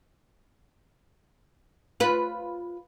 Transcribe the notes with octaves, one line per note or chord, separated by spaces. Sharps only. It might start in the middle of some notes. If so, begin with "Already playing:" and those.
F4 B4